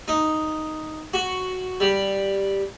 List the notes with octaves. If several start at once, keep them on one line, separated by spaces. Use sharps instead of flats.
D#4
F#4
G3